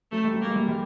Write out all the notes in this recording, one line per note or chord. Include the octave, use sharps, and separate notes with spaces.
F#3 A3
G3
F#3
A#3
G#3
G3
G3